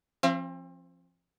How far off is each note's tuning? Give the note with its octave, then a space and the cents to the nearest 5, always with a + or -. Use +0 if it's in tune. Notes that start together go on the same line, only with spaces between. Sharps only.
F3 -15 C4 +35 F5 -40